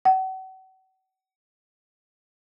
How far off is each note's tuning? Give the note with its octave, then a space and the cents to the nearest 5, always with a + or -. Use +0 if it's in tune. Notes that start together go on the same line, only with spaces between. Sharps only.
F#5 +40